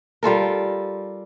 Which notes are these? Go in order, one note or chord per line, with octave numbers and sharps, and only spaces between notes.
G3 F4 A4 A#4